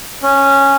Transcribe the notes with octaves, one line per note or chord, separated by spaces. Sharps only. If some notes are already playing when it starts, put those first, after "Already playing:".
C#4